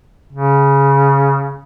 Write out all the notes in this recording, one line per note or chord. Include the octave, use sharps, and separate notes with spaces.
C#3